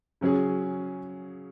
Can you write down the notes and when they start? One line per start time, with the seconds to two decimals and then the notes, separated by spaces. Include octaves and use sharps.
0.21 C#3 F#3 C#4 G#4